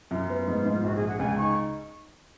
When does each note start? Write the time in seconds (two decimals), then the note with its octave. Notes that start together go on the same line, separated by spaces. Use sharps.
0.11 F#2 F4
0.30 B3
0.48 G#2
0.66 G#2
0.84 A#1 F#4
0.96 G#4
1.01 A#1
1.08 F#5
1.19 C#2 G#5
1.38 D#4 C#6